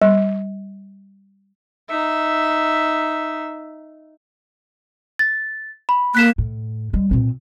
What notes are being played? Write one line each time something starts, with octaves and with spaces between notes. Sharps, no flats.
G3
D#4 E5
A6
B5
A#3 F#6 B6 E7
A2
G3 G#3
A#2 C4